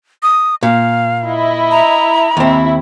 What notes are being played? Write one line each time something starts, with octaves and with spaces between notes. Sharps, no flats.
D#6
A#2 F5
E4 D#5
A#5
D#2 C4 E4